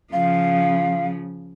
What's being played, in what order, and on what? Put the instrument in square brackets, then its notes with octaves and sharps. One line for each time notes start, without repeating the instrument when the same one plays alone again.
[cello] C#3 F3 [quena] F5